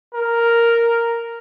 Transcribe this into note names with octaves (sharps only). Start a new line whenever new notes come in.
A#4